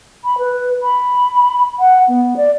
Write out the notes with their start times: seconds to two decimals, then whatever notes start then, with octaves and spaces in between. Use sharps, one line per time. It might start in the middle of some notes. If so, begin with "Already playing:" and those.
0.24 B5
0.38 B4
0.83 B5
1.79 F#5
2.08 B3
2.37 D5